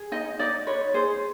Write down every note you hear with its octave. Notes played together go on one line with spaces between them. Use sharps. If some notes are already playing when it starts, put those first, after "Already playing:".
Already playing: G#4
D#4 D#5
D#4 D5
B4 C#5
G#4 C5